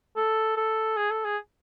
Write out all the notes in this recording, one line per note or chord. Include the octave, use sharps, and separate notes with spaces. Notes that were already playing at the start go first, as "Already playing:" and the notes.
A4
A4
G#4
A4
G#4